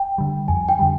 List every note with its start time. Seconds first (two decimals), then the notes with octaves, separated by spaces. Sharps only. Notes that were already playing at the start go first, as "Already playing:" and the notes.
Already playing: G5
0.18 D3 G3
0.48 F2 G#5
0.69 G5
0.79 D3 G3